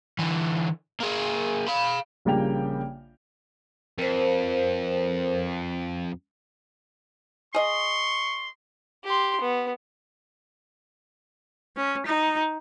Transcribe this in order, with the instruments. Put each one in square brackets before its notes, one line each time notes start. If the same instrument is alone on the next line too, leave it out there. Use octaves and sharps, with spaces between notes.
[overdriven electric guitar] D3 E3
A#3 G#4
F5 B5
[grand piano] A#1 C#3 G3 A#3 G5 F7
[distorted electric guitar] F2 [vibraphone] A#4 C5
[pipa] G#4 D#5 [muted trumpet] C6 [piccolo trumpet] C#6
[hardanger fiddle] G4 C6
B3
[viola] C#4
D#4